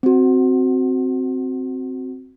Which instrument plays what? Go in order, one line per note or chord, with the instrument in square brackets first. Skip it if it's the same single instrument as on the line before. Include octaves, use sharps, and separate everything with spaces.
[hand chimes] C4 F#4